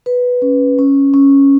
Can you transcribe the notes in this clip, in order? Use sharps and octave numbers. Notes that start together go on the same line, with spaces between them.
B4
C#4
C#4
C#4